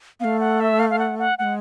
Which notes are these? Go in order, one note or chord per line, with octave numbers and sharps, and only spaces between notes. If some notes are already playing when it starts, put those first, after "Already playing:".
A3 B3 F5
F#5
E5
F5
F5
F#5
F#5
G#3 A3 F#5